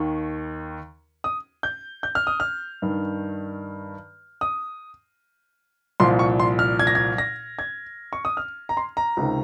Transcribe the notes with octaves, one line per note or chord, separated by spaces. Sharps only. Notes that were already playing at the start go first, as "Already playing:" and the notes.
Already playing: D#2 D#3
D#6
G6
G6
F6
D#6
F6
G2 D#3
D#6
C2 A#2 F3 C6
C#6
C6
F6
G#6
A#6
G#6
A#6
G#6
C#6
D#6
F6
A#5
C6
A#5
C#2 C3 D#3